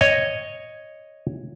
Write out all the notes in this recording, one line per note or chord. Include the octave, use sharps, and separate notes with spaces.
C#5 D#5